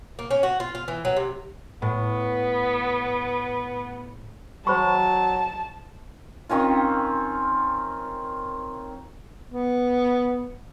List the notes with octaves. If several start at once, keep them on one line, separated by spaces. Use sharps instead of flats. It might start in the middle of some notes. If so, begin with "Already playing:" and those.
A#3
C#4
F#4
F4
F4
E3
F#3
C3
A2 B3
F#3 C5 A5 B5 C#6
D#3 C4 C#4 F4
B3